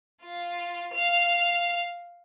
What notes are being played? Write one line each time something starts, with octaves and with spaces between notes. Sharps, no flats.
F4
F5 F7